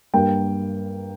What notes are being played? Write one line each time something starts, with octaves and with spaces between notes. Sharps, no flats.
G2 G3 A#3 G5